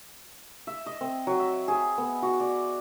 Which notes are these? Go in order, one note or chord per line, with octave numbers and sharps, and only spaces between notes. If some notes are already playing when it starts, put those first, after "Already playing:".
E5
D#5
C4
F#3
E5
G#4
B3
F#4
D5